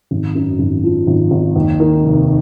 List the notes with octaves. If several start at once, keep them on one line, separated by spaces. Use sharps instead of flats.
G#1
F#2
G#1
F3
G#1
G#1
D#2
D#3
F1